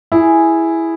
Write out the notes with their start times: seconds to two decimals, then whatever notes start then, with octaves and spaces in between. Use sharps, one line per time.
0.12 E4 G#4